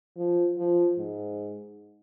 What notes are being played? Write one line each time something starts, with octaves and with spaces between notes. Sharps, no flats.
F3
F3
G#2